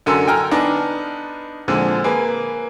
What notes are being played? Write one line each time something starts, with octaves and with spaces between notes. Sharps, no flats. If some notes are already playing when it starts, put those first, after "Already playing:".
F#2 D3 A4 A#4 G#5 C6
G5 G#5 A#5 F6
B3 D4 D#4
A#2 D3 F3 G#3 C4
A#3 G#4 B4